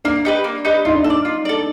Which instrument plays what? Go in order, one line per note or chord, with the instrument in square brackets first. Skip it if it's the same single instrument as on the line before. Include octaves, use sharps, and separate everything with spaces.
[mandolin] A#3 [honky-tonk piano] D4
[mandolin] D#4 G4 B4
A#3
D#4 G4 B4
[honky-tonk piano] D#4 [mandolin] F4
[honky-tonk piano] D4
[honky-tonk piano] D#4 [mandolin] A4
[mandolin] D5
F4
A4 D5